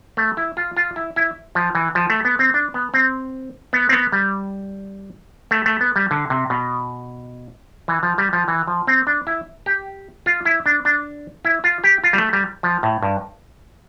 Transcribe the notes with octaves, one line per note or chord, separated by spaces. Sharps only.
A3
E4
F4
F4
E4
E4
F3
E3
F3
A3
B3
C4
D4
B3
C4
B3
C4
B3
G3
A3
A3
B3
G3
D3
C3
B2
E3
F3
G3
F3
E3
F3
C4
D4
E4
G4
F4
E4
D4
D4
E4
F4
G4
F4
G3
A3
G3
F3
A2
G2